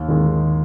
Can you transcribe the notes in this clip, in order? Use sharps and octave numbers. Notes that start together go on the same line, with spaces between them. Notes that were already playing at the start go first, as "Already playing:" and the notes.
Already playing: D#2
D#3 G#3